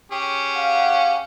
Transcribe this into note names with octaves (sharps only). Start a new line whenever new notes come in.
C#4 G4 G#4
F5 F#5